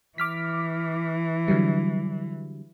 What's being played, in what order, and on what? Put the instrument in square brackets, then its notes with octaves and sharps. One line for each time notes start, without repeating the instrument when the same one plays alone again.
[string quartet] E3 [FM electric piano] D6 F6 B6
[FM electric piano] D3 F#3 G3